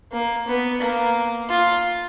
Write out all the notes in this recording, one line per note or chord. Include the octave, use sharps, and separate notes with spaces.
A#3
B3
A#3
F4